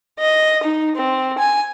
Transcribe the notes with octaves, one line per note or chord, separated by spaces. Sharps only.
D#5
D#4
C4
G#5